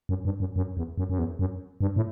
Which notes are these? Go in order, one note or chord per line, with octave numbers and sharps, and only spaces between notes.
F#2
G2
F#2
F#2
E2
F#2
F#2
E2
F#2
G2
A2